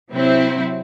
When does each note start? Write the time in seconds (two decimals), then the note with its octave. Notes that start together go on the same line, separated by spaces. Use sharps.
0.11 C3 F#3 C4 E4